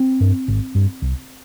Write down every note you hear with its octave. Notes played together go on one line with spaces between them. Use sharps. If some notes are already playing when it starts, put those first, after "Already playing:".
Already playing: C4
G2
G#1
G2
C2